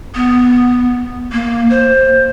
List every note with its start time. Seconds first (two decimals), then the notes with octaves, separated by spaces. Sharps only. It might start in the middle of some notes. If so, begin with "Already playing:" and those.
0.15 B3
1.32 A#3
1.70 C5